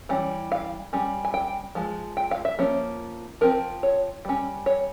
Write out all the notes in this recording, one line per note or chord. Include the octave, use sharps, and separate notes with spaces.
E3 G3 C#4
F5
G3 C#4
G#5
G5
F3 G#3
G5
F5
E5
F3 A#3 C#4
F3 C4 A#4
C#5
G3 C#4
C#5